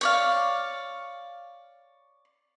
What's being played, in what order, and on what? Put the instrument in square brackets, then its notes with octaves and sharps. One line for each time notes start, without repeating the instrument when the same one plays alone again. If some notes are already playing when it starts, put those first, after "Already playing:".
[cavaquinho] C#5 D5 F5